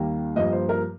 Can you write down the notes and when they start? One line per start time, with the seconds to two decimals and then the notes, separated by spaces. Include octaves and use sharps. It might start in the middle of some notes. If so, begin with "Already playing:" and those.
Already playing: D#2 D#3 G3 A#3
0.36 G2 F3 A#3 D#5
0.53 C5
0.69 A#4